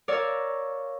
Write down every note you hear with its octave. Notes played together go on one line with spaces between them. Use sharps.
A#4 C#5 D5 F5 E6